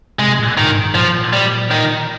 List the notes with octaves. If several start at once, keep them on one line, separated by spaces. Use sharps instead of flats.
C3 G#3
A#2
G#2 D#3
G#2
A#2 F3
G3
D#3